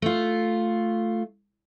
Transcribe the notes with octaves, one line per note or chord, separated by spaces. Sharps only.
A3 F4